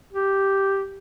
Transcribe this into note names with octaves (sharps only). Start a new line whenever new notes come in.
G4